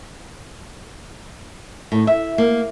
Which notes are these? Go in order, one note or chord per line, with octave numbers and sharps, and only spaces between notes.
A2
E5
A#3